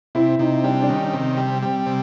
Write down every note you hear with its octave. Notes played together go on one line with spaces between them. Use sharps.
C3 E4
C3 D#4
G3 D4
D4
D#3 C#4
C3 C4
G3
G3
C3